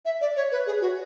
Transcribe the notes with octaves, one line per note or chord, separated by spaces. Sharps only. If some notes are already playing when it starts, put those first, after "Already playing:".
E5
D5
C#5
B4
G#4
F#4